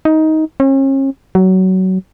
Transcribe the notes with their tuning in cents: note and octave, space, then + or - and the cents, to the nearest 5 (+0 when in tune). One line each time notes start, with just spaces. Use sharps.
D#4 +15
C#4 -40
F#3 +20